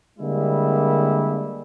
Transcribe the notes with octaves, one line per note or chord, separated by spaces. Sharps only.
D3 G3 G#3 A#3 E4